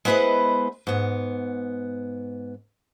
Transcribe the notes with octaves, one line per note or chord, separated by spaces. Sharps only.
G#3 B3 E4 B4 C5 D#5
G#2 B3